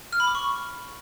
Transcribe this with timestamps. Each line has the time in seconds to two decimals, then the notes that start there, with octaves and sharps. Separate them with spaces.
0.13 F6
0.20 B5
0.27 D6
0.35 C#6